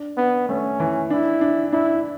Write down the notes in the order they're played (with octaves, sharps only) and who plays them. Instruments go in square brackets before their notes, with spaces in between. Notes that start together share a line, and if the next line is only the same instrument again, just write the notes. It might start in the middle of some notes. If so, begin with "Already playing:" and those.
Already playing: [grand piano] D4
[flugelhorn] B3 [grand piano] D4
[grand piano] A3 [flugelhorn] C#4
[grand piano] E3
[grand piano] D4 [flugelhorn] E4
[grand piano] D4
[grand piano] D4 [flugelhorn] E4